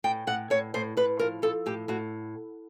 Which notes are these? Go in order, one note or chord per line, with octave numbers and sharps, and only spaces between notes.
A2 G5
A2 F#5
A2 C#5
A2 C5
A2 B4
F3 A#4
F3 A4
A2 G4
A2 F#4